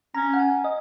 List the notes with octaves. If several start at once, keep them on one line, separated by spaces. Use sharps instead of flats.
C#4 A#5
F#5
G#5
D#5